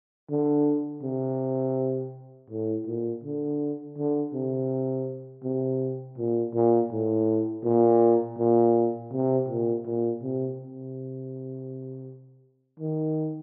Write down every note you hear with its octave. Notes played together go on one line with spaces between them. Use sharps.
D3
C3
A2
A#2
D3
D3
C3
C3
A#2
A#2
A2
A#2
A#2
C3
A#2
A#2
C3
C3
D#3